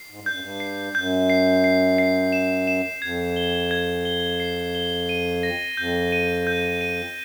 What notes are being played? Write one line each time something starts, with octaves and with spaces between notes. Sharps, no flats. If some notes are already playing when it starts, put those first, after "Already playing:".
Already playing: C7
G#2
G2
F#2 G6
G2
C7
F#2 G6
C7
C7
C7
E7
E7
F2 G#6
G7
G#6
G7
C7
G7
D#7
A#6
F2 G6
D#7
G6
D#7